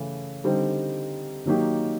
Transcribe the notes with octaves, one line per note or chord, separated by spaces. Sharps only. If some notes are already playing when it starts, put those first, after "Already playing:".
Already playing: C#3 E3 A3 C#4
D3 G3 C4 D#4
D#3 F#3 A#3 D#4 G4